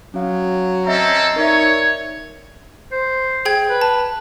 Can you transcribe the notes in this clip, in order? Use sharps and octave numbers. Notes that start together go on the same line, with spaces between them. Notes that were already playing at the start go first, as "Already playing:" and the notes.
F#3 C#4 F5
C4 C#4 A4 D#5 E5 A#5
D#4 A#4 C#5 D5 E5
C5
G#4 G5 G#6
B4
A5